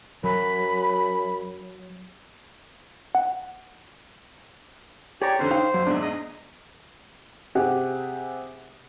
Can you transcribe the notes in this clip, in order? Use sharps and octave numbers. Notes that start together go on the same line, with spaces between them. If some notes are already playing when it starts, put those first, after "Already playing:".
F#2 F#3 B5
F#5
G4 G#4 C#5 D5 A#5
F2 D3 C#4 C5
D#4 F5 G5
F#1 F#3
E2 G#2 D4 E5
D#5
C3 G4 G#4 F#5